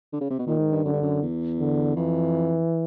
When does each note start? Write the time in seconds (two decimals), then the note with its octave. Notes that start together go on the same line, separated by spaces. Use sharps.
0.13 D3
0.21 C#3
0.30 C3
0.39 B2
0.47 A#2 D#3
0.59 G#2
0.72 G2
0.85 F#2 D3
0.93 G2
1.02 F#2
1.22 E2
1.60 D3
1.96 F2 E3